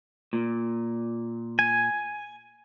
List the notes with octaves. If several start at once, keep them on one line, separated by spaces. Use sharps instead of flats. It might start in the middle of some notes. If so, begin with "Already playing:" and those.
A#2
G#5